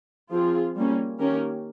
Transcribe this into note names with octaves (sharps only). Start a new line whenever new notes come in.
F3 C4 F4 G#4
G3 A#3 C#4
D#3 A#3 C#4 G4 A#4